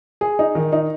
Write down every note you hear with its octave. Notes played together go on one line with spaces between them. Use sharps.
G#4
D#4
D#3
D#4